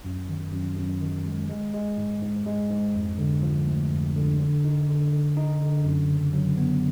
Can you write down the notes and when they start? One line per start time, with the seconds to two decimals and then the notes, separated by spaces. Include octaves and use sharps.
0.05 F#2
0.29 D#3
0.52 F#2
0.77 F#2
1.01 D#3
1.26 G#3
1.49 G#3
1.74 G#3
1.98 G#2
2.22 G#2
2.46 G#3
2.70 G#2
2.95 F2
3.18 D3
3.43 F3
3.67 A3
3.91 F2
4.16 D3
4.40 D3
4.64 D#4
4.89 D3
5.13 D3
5.37 D#4
5.61 D3
5.84 F#2
6.10 C#3
6.33 F#3
6.57 B3